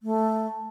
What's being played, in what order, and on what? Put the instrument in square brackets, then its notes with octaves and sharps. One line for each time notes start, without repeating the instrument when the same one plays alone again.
[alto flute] A3